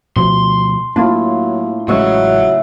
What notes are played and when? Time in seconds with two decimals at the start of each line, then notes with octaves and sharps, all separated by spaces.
0.16 D2 B2 F3 C6
0.96 A2 F#3 A#3 D4 F4
1.88 A1 C#3 F#3 G#3 E5 C#6